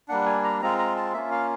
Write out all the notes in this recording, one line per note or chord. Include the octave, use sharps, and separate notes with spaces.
G3 A#3 D4 F#5
G#5
A#5
G#3 C4 F4 A#5
A#5
A5
A#3 C#4 F4 E5
F5